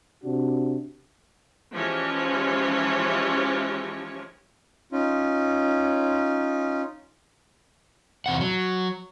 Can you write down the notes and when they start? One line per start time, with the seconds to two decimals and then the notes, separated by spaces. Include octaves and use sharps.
0.23 C3 D4 F#4
1.73 E3 F3 G#3 C#4 G4 C#5
4.92 C#4 D#4 F4
8.26 E2 C3 F#5
8.41 F#3